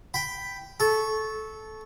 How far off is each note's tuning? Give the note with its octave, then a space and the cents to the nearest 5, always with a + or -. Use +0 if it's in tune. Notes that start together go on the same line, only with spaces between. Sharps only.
G5 +0 B5 +5
A4 -15 C#6 -5